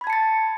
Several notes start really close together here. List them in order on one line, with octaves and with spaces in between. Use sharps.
B5 G#6 A5 C#7 A6